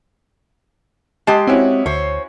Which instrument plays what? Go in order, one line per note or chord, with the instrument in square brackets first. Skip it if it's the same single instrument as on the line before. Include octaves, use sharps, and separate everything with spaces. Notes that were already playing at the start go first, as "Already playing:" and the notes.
[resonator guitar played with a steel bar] G#3 G4 [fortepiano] A5
[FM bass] C4 [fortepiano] C#4 E4 F#4
[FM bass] D2 [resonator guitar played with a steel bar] C5 C#5